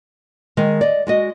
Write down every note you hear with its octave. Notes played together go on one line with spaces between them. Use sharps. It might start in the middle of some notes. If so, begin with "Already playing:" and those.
D#3 G#3
D5 D#5
G#3 F#4 D#5